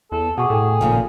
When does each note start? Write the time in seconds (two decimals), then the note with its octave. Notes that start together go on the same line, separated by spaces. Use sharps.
0.12 E2 A4
0.38 B2 G#4 F#5 C#6 D6
0.50 A2 A4 G5 G#5
0.81 G#1 A#2 C#3 F3